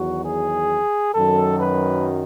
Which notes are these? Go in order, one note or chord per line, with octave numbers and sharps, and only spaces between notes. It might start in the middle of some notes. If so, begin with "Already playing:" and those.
Already playing: E2 D#3 F#3 F#4
G#4
F#2 D#3 F#3 A4
B4